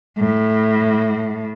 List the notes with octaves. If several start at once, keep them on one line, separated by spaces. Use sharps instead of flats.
A2